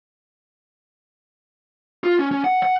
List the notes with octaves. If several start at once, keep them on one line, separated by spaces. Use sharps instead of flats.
F4
C#4
C#4
F#5
F#5